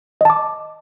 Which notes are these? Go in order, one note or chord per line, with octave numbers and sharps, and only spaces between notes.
D#5 A5 D6